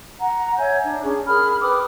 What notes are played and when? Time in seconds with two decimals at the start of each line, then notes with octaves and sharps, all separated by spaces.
0.20 F#5 A#5
0.58 C#5 E5 G#5 G6
0.84 D4
1.02 C#4 G#4
1.26 G#4 A#4 B5 F6
1.62 B4 G5 D6 D#6